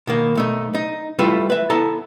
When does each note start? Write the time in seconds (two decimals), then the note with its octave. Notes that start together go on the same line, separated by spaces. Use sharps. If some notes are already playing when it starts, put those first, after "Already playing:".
0.07 B2 D#3 A#3
0.35 B1 A3 D#4
0.75 D#4
1.19 G3 A3 E4 F4 A4 B4
1.50 B4 E5
1.70 B3 E4 A4 A5 A#5